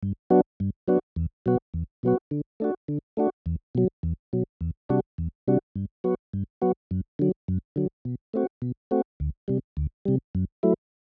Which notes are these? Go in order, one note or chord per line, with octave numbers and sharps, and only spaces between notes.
G2
F#3 B3 D4 F#4
G2
F#3 B3 D4 F#4
E2
B2 F#3 B3 F#4
E2
B2 F#3 B3 F#4
D3
A3 D4 F#4
D3
A3 D4 F#4
E2
B2 F#3
E2
B2 F#3
E2
C3 G3 D4 F#4
E2
C3 G3 D4 F#4
G2
F#3 B3 F#4
G2
F#3 B3 F#4
F#2
D3 F#3
F#2
D3 F#3
B2
A3 C4 F#4
B2
A3 C4 F#4
D2
C3 G3
D2
C3 G3
F#2
F#3 A3 E4